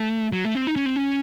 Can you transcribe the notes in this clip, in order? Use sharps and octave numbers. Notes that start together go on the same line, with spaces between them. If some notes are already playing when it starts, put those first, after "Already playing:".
Already playing: A3
F#3
A3
C4
D#4
C#4
C4
C#4